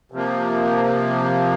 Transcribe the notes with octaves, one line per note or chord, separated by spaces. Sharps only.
C3 F3 A#3